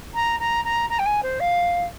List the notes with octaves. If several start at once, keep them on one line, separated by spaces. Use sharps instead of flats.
A#5
A#5
A#5
A#5
G5
G#5
C5
F5